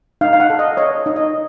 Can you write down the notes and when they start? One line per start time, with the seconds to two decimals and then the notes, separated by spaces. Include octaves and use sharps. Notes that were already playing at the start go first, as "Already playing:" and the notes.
0.21 D#4 F5
0.33 F5
0.40 F#5
0.50 A4
0.59 D#5
0.77 C#5 D#5
1.06 D#4
1.16 D#5